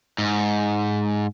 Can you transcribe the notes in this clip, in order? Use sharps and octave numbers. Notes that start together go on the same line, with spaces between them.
G#2